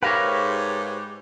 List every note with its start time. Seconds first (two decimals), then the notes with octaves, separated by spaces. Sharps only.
0.03 G#2 G4 A#4 B4 C#5 E5 F5